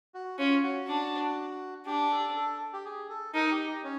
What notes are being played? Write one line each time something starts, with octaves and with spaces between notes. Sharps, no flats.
F#4
C#4 F4
F#4
D4
D4 G4
A4
A4
G4
G#4
A4
D#4 A#4
G4
D#4
C#4